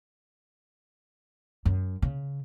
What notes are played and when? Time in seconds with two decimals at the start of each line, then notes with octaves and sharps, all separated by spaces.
1.65 F#2
2.02 C#3